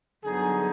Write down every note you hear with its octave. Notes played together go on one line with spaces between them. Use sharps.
G2 D3 F#3 B3 D#4 G#4